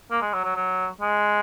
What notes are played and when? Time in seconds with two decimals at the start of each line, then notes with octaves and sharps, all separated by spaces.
0.11 A#3
0.22 G#3
0.33 F#3
0.44 F#3
0.56 F#3
1.02 G#3